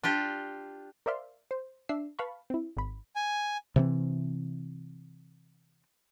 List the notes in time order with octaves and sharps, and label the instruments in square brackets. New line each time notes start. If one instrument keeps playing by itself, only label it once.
[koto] D4 F4 G4
[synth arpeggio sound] A#4 C5 D5 E5 F5 C6
C5
D4 E5 E6 C7
B4 F5 A5 B5 C#6
C4 E4
G#1 B5
[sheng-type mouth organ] G#5
[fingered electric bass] C3 E3 C4